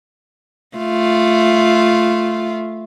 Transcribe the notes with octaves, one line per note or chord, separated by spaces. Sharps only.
A3 F4